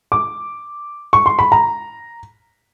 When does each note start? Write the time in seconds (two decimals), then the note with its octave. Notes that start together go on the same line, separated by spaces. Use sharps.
0.12 D6
1.13 C#6
1.26 C6
1.39 B5
1.52 A#5